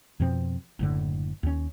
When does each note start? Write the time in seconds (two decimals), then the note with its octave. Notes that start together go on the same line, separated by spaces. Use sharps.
0.20 F2 B2 F3 C4
0.79 F#1 A2 D3
1.43 D#2 C#4